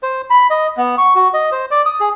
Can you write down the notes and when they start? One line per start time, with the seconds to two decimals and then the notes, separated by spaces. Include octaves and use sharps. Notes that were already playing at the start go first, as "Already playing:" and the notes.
0.03 C5
0.30 B5
0.50 D#5
0.77 B3
0.98 C#6
1.15 F#4
1.34 D#5
1.52 C5
1.71 D5
1.86 D#6
2.00 G#4